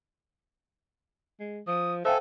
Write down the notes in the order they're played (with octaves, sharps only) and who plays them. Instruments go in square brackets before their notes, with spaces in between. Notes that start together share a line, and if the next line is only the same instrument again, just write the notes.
[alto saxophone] G#3
[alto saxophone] F3 [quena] D#6
[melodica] A4 [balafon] C5 F5 G5 [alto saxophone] E5 [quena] G#5